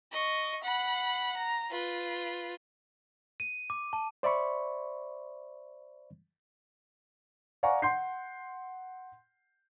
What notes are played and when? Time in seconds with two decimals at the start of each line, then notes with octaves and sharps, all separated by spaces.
0.12 D#5 C#6
0.64 F#5 B5
1.37 A#5
1.71 F4 B4
3.40 D#7
3.70 D6
3.93 A5
4.23 C5 D5 E5 B5 C#6
7.63 D5 F5 F#5 G#5 A#5 C#6
7.82 F#5 C6 G6 C7